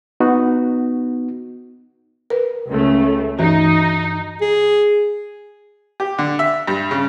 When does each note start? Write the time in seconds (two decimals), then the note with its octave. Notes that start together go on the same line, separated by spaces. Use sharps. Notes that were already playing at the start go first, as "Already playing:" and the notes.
0.20 B3 D#4 F#4
2.30 A#4 B4
2.68 C#2 C#3 A3
3.39 G2 E3 D#4 F#4
4.41 G#4
6.00 G4
6.18 D3
6.39 E5
6.67 G2
6.91 C#3